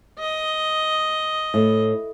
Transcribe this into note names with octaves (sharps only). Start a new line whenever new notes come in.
D#5
A2